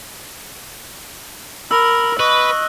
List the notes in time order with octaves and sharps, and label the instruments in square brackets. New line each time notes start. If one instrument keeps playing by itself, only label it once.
[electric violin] A#4 [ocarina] B5 [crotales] E6
[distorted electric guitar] B4 [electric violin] D#5 [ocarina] C#6 [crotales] F#6